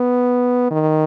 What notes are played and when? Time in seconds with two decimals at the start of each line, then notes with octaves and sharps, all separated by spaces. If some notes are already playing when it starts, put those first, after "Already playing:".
Already playing: B3
0.71 D#3